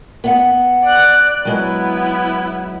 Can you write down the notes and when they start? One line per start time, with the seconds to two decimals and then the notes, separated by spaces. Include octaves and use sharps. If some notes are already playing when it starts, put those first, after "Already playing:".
0.24 B3 F5 F#5
0.84 D5 F#6
1.45 F#3 G#3 B3 E4